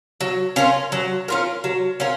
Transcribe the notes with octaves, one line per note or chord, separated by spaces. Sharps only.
F#3
C#4 F4 A#4
F#3
C#4 F4 A#4
F#3
C#4 F4 A#4